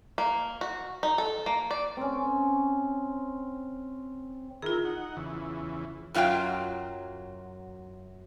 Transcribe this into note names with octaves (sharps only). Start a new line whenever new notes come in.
A#3
F#4
D#4
A4
A#3
D5
C4 C#4
D#3 E4 F4 G#4 A#4
D#4 F#5
E2 C#3 E3
F#2 F#3 F4 F5 G5